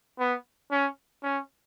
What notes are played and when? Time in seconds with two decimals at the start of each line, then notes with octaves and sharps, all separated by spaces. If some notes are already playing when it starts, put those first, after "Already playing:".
0.19 B3
0.71 C#4
1.23 C#4